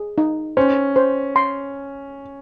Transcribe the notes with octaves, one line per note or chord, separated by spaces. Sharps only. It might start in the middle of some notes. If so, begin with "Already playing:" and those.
Already playing: G#4
D#4
C#4 C5
C5
C6